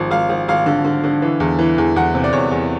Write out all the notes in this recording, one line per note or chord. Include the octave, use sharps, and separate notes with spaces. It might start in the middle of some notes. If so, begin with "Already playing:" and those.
Already playing: G#1 F3
G#1 F5
G#1
G#1 F5
D3
D3
D3
E3
E2
E3
E2
E2 F#5
C3
D5
E2 C#5
E2